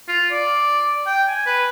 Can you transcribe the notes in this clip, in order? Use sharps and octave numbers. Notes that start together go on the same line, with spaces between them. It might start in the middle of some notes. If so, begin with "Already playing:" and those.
F4
D5
G5
G#5
B4